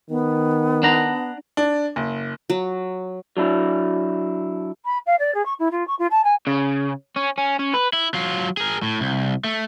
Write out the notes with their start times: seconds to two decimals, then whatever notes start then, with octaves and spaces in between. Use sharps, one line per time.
0.10 D#3 B3
0.83 D4 F#5 A#5
1.57 D4
1.96 F#1
2.50 F#3
3.37 F#3 D4 E4
4.85 B5
5.06 F5
5.19 D5
5.35 G#4
5.46 C#6
5.59 E4
5.71 F4
5.88 C#6
5.99 F4
6.11 A5
6.24 G#5
6.47 C#3
7.16 C#4
7.38 C#4
7.59 C#4
7.74 B4
7.93 E4
8.14 F#3 F4
8.57 G#4 A#4
8.82 A2
9.01 C2
9.44 A3